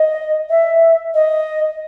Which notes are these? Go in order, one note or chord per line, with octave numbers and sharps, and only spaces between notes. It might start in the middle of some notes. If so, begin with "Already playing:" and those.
Already playing: D#5
E5
D#5